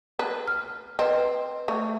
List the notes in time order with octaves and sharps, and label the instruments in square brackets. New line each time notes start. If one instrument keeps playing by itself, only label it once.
[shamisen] B4
[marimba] F6
[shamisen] C4 [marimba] B4 D#5
[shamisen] A3